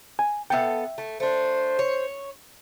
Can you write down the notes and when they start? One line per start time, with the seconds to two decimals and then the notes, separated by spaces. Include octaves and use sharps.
0.19 G#5
0.50 B3 A4 E5 G5
0.98 A3
1.20 A3 D4 C5
1.79 C#5